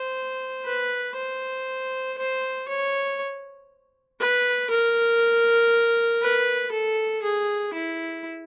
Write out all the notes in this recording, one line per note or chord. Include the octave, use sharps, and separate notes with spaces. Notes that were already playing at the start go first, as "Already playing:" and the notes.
Already playing: C5
B4
C5
C5
C#5
B4
A#4
B4
A4
G#4
E4